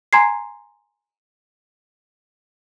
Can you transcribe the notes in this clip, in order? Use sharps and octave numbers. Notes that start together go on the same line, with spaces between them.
G#5 A#5 C6 G#6 C7